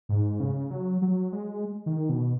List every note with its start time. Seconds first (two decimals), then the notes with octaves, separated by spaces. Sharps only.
0.09 G#2
0.40 C#3
0.71 F#3
1.02 F#3
1.33 G#3
1.86 D#3
2.09 B2